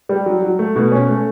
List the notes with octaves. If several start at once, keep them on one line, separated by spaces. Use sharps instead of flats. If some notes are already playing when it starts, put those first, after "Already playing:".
G3
F#3
F#3
A3
B2
C#4
A3